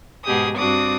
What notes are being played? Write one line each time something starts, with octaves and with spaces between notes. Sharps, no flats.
G#2 B2 G4 G#4 D#6
G2 C4 D4 F#4 D6 D#6